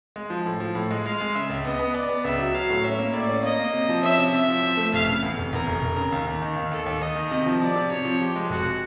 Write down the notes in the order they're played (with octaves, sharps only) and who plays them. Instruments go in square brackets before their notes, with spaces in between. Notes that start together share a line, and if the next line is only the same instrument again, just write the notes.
[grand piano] G#3
F3
A2
F3
A2
G#3
[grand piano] G#3 [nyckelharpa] F5
[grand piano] G#3
[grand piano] C#3 [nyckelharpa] E5
[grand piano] C#2
[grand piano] B3 [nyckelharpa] D#5
[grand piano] B3
[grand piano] B3 [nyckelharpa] D5
[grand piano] B3
[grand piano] C#2 [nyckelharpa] E5
[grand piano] F#3
[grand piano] F#3 [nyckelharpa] F5
[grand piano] A2
[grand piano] C#4 [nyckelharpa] E5
[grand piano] A#3
[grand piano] A2 [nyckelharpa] D5
[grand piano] C#4
[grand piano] A#3 [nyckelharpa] D#5
[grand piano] A#3
C3
F3
[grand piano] C#4 [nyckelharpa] E5
[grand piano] C3
[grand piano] C3 [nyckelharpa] E5
[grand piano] F3
F3
A3
[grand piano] F1 [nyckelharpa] F5
[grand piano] C#3
E2
F1
[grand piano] E2 [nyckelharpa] A#4
[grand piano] F1
F1
C#3
D#2
D#2
D#3
D#2
[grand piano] D#2 [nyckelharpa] A4
[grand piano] D#2
[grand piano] D#2 [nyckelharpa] D#5
[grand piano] D#3
[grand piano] C3 [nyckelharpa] D#5
[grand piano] F3
[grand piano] C3 [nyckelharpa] D5
[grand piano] C3
[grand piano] C3 [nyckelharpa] C#5
[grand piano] F3
[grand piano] F3 [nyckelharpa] G4
[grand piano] G#3
[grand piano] F1 [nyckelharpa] F#4